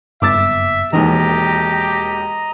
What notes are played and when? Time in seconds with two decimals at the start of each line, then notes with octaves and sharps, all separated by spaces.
0.22 F#1 G2 B3 E5 D6 E6 A6
0.93 E1 D#2 D#3 E3 G4 D#5 A#5